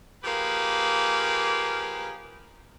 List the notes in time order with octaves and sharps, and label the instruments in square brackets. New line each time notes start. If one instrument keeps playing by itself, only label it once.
[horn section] F3 A#3 G4 G#4 B4